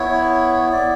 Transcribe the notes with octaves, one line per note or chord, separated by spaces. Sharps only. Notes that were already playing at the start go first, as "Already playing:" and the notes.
Already playing: B3 E4 C#5
B3 E4 D5